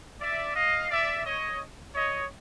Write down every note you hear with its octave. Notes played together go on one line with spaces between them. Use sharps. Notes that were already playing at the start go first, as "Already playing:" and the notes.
D5 E5
D#5 F5
D5 E5
C#5 D#5
C#5 D#5